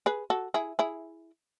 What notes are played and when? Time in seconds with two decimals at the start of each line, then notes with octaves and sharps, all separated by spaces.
0.06 G#4 B4
0.30 F#4 A4
0.54 E4 G#4
0.79 E4 G#4